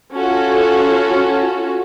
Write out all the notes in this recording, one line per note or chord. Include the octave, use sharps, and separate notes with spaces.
C#4 F4 F#4 A4